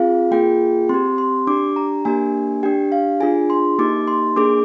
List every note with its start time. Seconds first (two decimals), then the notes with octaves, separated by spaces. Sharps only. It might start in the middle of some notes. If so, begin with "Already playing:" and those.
Already playing: C4 F4 G#4 F5
0.31 A#3 F4 G#4 G5
0.89 C4 G4 C6
1.18 C6
1.47 D4 G4 D6
1.76 A#5
2.05 A#3 D4 G4 G#5
2.63 D4 G4 G5
2.92 F5
3.20 D4 F4 G#4 G#5
3.50 C6
3.79 A#3 D#4 G4 D6
4.07 C6
4.36 A#3 D4 G#4 D6